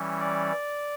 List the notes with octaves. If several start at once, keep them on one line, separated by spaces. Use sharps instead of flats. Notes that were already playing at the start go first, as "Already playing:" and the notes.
Already playing: E3 G3 C#4
D5